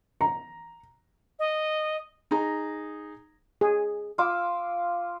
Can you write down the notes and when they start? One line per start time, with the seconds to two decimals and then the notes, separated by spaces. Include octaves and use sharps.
0.21 A#5
1.39 D#5
2.31 D#4 G#4 A#5
3.61 G#4
4.18 F4 D6 E6